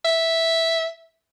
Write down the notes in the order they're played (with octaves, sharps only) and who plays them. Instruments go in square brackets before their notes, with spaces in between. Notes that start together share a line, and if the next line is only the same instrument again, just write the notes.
[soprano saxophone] E5